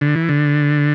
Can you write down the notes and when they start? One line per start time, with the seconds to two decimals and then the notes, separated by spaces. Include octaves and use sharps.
0.01 D3
0.15 E3
0.29 D3